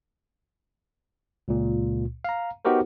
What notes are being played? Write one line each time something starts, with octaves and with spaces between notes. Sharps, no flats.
C#2 A#2
F5 A#5
B3 D#4 F#4 G4 A#4 C5